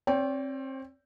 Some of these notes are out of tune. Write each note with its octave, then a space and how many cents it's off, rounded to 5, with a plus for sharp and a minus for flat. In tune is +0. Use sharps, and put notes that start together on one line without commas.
C4 +30 D5 -45 G5 +0